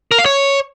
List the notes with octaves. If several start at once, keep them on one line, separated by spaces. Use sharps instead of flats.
A#4
F5
C#5